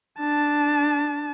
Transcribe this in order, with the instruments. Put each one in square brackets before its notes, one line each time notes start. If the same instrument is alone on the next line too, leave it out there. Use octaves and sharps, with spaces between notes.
[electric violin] D4 A5